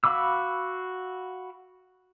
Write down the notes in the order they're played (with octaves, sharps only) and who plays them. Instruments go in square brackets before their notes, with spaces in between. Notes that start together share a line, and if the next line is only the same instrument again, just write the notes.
[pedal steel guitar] F#4 F5 B5 D6 E6